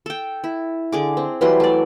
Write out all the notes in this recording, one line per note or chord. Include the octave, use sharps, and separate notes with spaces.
A4 G5
E4
D3 G#4 D6
C4
E3 F#3 G3 C6
A3 D5